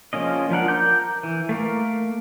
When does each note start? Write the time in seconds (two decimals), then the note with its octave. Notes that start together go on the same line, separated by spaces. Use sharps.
0.13 F3 G#3 A#3 C#4 D#5
0.50 F3 D4 A#4 F#5
0.68 A#4 A#5 D6 G6
1.23 E3
1.49 A3 A#3 A#4